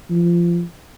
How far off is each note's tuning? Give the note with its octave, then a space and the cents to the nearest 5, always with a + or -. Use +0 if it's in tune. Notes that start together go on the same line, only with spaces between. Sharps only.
F3 -20